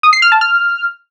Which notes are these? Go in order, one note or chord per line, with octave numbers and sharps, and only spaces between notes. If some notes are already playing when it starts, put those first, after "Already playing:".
D#6
C7
F6
A5
F6